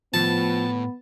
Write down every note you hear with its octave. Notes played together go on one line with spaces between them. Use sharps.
A2 F3 B3 A5